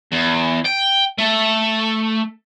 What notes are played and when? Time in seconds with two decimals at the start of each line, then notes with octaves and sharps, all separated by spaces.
0.12 E2
0.65 G5
1.18 A3